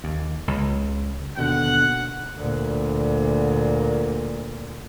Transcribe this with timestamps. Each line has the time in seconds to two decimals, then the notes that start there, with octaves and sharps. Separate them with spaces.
0.04 D#2
0.48 C#2
1.37 D#2 B2 D3 F#5
2.36 D2 A#2